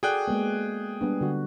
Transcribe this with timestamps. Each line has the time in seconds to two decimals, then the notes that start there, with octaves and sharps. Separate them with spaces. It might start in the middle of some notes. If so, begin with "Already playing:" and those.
0.03 F#4 G#4 A4 D5 G5 F#6
0.28 G#3 A#3 B3
1.01 G3 B3 D4
1.21 D3 G3 F#4